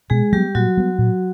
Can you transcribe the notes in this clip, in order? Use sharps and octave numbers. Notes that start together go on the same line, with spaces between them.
B2 G#3 G#4
F#3 G3 B3 G4
A#2 F#3 F#4
G3 B3
A#2